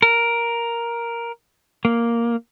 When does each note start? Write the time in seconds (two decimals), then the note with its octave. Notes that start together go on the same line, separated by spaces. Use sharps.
0.02 A#4
1.85 A#3